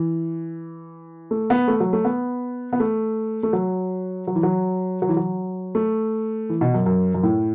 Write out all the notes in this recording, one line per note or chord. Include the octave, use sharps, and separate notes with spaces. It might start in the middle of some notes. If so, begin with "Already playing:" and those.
Already playing: E3
A3
B3
A3
F#3
A3
B3
B3
A3
A3
F#3
F#3
E3
F#3
F#3
E3
F#3
A3
E3
B2
F#2
F#2
F#2
A2